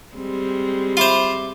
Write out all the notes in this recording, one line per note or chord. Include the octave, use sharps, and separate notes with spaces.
G3 G#3 C4
F4 C5 E5 B5 D6